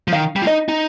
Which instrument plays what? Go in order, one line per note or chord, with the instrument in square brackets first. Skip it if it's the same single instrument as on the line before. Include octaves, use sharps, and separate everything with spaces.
[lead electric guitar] F3
[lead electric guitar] D#3 [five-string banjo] F5
[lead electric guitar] G3
F4
[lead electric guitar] D#4 [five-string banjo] D#5
[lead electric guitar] D#4